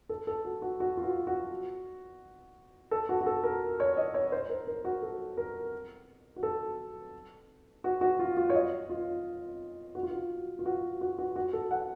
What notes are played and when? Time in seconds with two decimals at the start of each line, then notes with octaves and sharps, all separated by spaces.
0.09 A4
0.27 A4
0.45 F#4
0.62 F#4
0.80 F#4
0.97 F4
1.04 F#4
1.27 F#4
2.91 A4
3.09 F#4
3.21 F#4
3.26 A4
3.43 A#4
3.80 C#5
3.97 D#5
4.14 C#5
4.32 C5
4.50 A#4
4.67 A#4
4.85 F#4
5.02 A4
5.37 A#4
6.36 F#4
6.43 A4
7.84 F#4
8.01 F#4
8.19 F4
8.37 F4
8.50 C#5
8.54 D#5
8.89 F4
9.95 F#4
10.03 F4
10.11 F#4
10.59 F4
10.66 F#4
11.01 F#4
11.18 F#4
11.36 F#4
11.53 A4
11.71 F#5